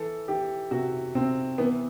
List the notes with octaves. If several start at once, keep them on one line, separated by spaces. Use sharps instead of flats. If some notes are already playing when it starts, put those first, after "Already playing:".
Already playing: E3 A4
E3 G4
C3 F#4
C3 C4
E3 B3